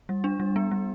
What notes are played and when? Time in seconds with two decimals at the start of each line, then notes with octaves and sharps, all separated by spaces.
0.09 G3
0.24 D4
0.40 G3
0.56 B3
0.71 G3